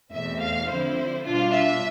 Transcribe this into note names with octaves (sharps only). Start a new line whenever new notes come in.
E2 B2 A3 C4 E5
F5
D3 F3 C4 E4 C5
B2 G3 D4 F4
E5